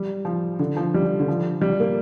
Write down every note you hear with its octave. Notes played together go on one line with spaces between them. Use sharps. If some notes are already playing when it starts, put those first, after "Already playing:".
Already playing: G3
F3
D3
F3
G3
D3
F3
G3
A#3